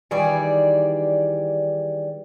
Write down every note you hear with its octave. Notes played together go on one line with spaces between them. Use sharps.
D#3 E3 G3 G#4 D5